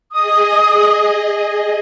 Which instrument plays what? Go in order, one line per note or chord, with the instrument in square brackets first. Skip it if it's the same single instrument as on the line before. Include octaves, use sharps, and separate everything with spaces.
[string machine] G#4 D#5 [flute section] D#6